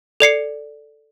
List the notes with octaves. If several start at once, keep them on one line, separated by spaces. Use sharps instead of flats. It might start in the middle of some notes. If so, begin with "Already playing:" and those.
A4 D5 C7 C#7